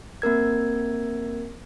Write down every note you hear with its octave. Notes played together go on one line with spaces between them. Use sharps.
A#3 C4 A#4 G#6